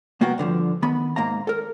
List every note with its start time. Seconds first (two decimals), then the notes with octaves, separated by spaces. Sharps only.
0.21 C2 A#3 B3 F#4 G5
0.38 G2 D3 D#3 F3
0.82 D#3 B3 B5
1.16 G#2 A#3 F5 A#5
1.47 A4 A#4